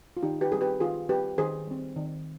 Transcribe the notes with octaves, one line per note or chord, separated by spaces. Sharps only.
F4
D#3 D#4 G4
G4 B4
G3 C4 G#4
G4 B4
D#3 F4 G#4
G3 C4 G4 B4
D#3 G#4 C5
G3 C4
D#3